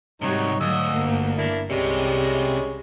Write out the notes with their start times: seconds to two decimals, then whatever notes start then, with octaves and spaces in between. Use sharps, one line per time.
0.22 G#2 C3 F#3 G3 D#4 C#5
0.60 D2 F#3 D#5 E6
0.92 G1 A#3
1.38 D4 E4 A#4
1.70 C2 C3 G3 G#3 C#4